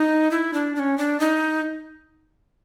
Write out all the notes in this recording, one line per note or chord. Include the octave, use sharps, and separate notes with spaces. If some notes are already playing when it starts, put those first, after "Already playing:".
Already playing: D#4
E4
D4
D4
C#4
D4
D#4